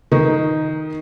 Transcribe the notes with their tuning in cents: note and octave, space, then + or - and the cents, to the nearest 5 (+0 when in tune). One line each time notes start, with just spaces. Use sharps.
D#3 +5 D#4 +0